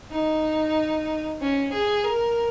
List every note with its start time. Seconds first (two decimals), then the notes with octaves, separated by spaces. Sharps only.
0.11 D#4
1.41 C#4
1.72 G#4
2.04 A#4